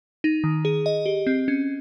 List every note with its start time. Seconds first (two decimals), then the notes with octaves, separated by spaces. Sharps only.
0.24 D#4
0.44 D#3
0.65 G#4
0.86 D#5
1.06 G4
1.27 C4
1.48 C#4